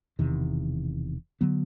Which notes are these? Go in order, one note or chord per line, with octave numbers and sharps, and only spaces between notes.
E1 E2 C3 D#3
D3 F#3 B3